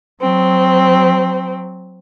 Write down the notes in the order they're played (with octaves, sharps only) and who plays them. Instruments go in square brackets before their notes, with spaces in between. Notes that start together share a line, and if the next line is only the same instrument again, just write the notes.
[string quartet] F#3 C4